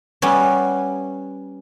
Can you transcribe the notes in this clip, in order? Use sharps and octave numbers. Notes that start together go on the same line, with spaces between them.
G3 B3 C#4